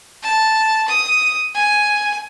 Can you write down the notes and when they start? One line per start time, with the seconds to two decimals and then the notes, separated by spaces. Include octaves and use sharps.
0.23 A5
0.88 D#6
1.55 G#5